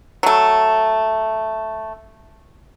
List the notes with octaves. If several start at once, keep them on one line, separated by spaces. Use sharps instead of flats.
F#3 A3